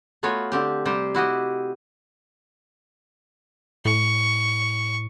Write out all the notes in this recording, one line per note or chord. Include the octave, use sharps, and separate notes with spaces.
A3 B3 F4 F#4 B4 C#5
D3 C4 G4
C3 G3 G4 C5
E4 F#4 G4 D#5
A2 C#6